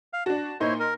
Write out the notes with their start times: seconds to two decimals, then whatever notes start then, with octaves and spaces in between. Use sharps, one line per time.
0.13 F5
0.26 D4 F#4 A5
0.60 A#2 D#4 E4 C5 C#5
0.80 A#4